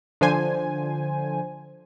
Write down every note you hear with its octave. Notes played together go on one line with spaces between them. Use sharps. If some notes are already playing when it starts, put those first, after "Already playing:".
D3 F3 C5 G#5